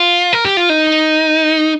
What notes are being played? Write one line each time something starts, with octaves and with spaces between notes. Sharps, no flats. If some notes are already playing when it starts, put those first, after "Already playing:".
Already playing: F4
A#4
G4
F4
D#4